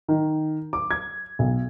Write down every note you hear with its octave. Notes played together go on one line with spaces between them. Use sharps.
D#3
D6
G#6
B1